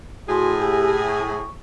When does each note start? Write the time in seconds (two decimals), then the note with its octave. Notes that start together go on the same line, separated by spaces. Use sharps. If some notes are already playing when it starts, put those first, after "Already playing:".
0.28 A2 F#4 G#4 G#5 C6
0.60 G4 G#5 E6
1.08 C#6